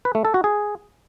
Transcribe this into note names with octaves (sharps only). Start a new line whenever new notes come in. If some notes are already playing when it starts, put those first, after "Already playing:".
B4
A3
A4
F#4
G#4